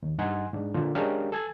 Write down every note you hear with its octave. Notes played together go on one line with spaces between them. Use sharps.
D#2
G2 D#4 F#5 G#5 C6
G#2 D4
A#2 D3 F4
G#3 C#4 D4 G4 A#4 F5
A4 G#5 G#6 A6